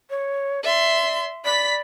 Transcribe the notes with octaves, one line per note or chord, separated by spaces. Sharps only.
C#5
D5 E5 C6
D5 B5 B6